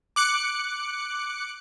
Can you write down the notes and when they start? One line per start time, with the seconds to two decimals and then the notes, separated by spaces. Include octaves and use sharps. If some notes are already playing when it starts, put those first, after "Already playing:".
0.16 D6 F#6 C#7